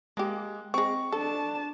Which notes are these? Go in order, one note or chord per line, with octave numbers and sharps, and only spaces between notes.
G#3 A#3 G4
G#3 C4 C#6
D4 A4 A5